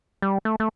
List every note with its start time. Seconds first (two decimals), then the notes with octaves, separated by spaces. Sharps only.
0.22 G3
0.45 A3
0.60 A3